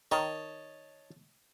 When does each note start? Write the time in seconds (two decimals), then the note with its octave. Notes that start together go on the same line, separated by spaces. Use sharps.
0.11 D#3 C#5 D#5 A5